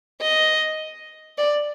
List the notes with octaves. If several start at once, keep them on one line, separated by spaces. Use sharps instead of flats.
D#5
D5